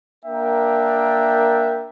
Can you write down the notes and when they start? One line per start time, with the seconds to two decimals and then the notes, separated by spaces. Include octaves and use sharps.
0.23 A#3 D4 A#4 E5 G5